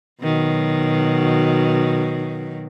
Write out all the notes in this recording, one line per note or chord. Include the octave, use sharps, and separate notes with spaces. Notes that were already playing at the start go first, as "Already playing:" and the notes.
B2 D#3 F#3